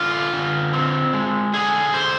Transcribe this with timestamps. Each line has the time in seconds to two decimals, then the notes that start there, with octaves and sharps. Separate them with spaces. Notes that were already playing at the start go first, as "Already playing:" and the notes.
Already playing: D3 F4
0.33 D3
0.73 C4
1.13 G#3
1.54 D3 G#4
1.94 D3 C5